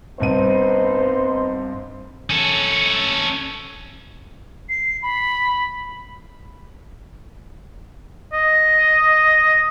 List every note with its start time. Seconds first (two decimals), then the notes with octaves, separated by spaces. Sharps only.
0.20 C2 G2 B3 D#4 C5 D#7
2.30 C#4 A4
4.69 C7
5.03 B5
8.33 D#5